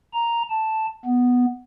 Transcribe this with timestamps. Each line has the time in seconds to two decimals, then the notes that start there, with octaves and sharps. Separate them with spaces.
0.14 A#5
0.50 A5
1.05 B3